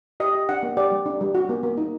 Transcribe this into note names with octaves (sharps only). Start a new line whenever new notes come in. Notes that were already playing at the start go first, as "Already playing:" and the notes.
G4 D#5
G4
D4 F#5
A#3
G4 D5
G3
D4
G3
F#4
A#3
A#3
D#4